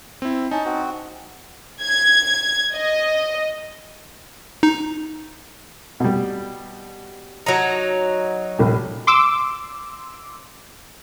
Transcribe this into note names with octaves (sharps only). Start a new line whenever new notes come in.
C4 E4
C#4 D#4 A5
C4 F#4
G#6
D#5
D#4
B2 G3
F#3 D#4
A#1 G3
C6 D6 E6